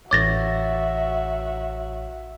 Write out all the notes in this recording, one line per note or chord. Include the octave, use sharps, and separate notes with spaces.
A1 F#4 C#5 E5 D6 A6 A#6